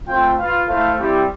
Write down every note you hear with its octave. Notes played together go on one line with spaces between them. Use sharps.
A3 C4 F4 C5 G5
F4 B4 F5
A3 E4 A4 C5 F5
G3 C4 E4 G4